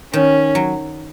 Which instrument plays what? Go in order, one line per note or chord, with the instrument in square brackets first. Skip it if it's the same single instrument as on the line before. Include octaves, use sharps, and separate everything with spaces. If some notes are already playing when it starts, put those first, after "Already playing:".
[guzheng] D#3 [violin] C#4
[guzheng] F#3